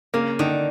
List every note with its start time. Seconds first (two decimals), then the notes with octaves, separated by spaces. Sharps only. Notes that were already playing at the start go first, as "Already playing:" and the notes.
0.14 C#3 A#3
0.39 D3 D#3